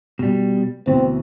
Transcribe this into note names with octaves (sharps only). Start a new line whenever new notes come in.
B2 G3
D2 B2 E3 C4